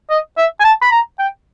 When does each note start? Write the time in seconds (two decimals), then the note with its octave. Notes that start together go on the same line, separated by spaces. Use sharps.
0.10 D#5
0.38 E5
0.60 G#5
0.64 A5
0.82 B5
0.91 A#5
1.19 G5